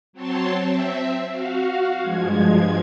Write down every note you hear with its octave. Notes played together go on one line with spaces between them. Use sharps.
F#3 C4 C#5 A5 C6
C4 E5
F#4 F5
G2 F3 G#3 G#6